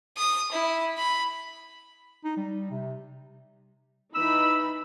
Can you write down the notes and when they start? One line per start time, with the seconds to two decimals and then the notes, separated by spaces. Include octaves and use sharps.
0.17 D#6
0.52 E4
0.98 B5
2.24 D#4
2.37 G3
2.71 C3
4.15 E3 D#4 B5 E6